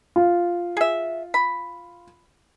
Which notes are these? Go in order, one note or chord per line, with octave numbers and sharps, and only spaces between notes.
F4
G#4 E5
B5